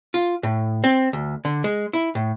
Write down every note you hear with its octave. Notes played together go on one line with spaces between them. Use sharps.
F4
A2
C4
D2
D3
G#3
E4
A2